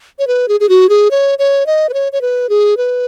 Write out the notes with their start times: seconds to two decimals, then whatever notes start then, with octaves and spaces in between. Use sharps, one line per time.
0.19 C#5
0.27 B4
0.48 G#4
0.60 G#4
0.69 F#4
0.89 G#4
1.11 C#5
1.39 C#5
1.66 D#5
1.89 B4
1.94 C#5
2.12 C#5
2.21 B4
2.49 G#4
2.77 B4